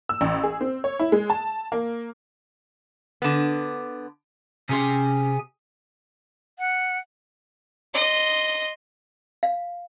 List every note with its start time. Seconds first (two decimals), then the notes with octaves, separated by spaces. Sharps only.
0.09 E6
0.21 A1
0.43 G#4
0.61 C4
0.84 C#5
0.99 E4
1.12 G#3
1.30 A5
1.72 A#3
3.22 D3 B3
4.69 C3 C#4 G4 G#4 G#5 C6
6.59 F#5
7.94 D#5 C6
9.43 F5